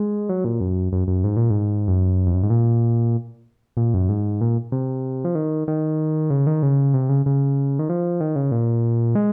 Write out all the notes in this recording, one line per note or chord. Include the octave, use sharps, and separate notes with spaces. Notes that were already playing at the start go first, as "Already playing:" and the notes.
Already playing: G#3
F#3
A#2
F#2
F#2
F#2
G#2
A#2
G#2
F#2
F2
F#2
G#2
A#2
A#2
F#2
G#2
A#2
C3
F3
D#3
D#3
C#3
D#3
C#3
C3
C#3
C#3
D#3
F3
D#3
C#3
A#2
G#3